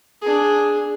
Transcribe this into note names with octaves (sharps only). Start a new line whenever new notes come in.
D4 G#4